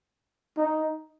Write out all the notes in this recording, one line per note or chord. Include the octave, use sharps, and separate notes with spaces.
D#4